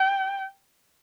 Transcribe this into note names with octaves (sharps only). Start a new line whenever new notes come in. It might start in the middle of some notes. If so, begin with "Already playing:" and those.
Already playing: G5